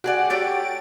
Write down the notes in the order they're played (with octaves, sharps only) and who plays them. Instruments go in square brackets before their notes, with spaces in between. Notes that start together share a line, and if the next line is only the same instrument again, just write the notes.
[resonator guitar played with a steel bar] G3 G#4 D5 [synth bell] F#4 F#5
[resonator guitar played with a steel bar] A3 G4 C#5 [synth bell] A6 D7